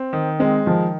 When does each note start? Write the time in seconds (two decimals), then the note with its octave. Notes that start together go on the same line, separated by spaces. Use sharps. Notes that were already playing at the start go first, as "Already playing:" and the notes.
Already playing: C4
0.13 D#3
0.39 G#3 C4
0.66 D#3 F3